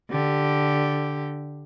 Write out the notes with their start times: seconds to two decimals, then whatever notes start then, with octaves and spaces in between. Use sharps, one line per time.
0.11 D3 G4